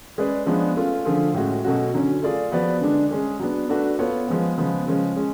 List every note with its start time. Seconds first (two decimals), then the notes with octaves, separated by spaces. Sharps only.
0.18 G#3 C#4 G#4 B4 D5
0.46 F3 G#3 B3 D4
0.77 A3 C#4 F4
1.05 D3 F3 A3 F4 G#4
1.34 A2 G#3 C#4 F#4
1.64 B2 F#3 A3 C#4 F#4
1.94 D3 F#3 C#4
2.22 A3 F4 G#4 D5
2.52 F3 B3 F#4 B4 D5
2.81 D3 G#3 D4
3.11 G#3 C#4 G#4
3.39 F#3 B3 D4
3.70 A3 D4 F#4 B4
3.99 B3 F4 A4 C#5
4.27 F3 G#3 B3
4.57 C#3 F3 G#3 B3
4.87 C#3 F3 G#3 C#4
5.16 G#3 C#4